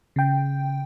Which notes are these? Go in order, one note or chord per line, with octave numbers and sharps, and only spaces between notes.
C#3 G5